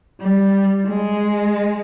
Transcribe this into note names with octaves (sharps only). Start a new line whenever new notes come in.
G3
G#3